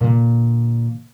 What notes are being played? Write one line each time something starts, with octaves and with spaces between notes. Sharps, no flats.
A#2 D3